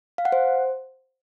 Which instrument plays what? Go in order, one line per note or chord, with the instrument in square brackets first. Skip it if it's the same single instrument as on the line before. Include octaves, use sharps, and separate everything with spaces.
[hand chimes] F5
F#5
C5